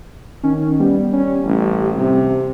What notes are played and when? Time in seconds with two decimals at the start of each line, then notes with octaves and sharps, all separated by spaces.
0.43 D#3 C#4
0.80 G3 B3
1.13 C#4
1.44 A1
1.98 C3